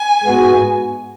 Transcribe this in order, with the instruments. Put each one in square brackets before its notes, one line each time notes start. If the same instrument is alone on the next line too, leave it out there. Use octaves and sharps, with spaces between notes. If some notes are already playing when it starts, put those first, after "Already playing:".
Already playing: [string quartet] G#5
[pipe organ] G#2 G#3 B3 F#4